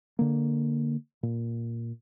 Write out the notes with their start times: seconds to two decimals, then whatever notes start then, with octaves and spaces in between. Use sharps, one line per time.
0.19 D3 A#3
1.23 A#2